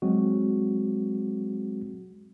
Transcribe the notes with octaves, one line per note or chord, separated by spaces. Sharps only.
F#3 G#3 C4 F#4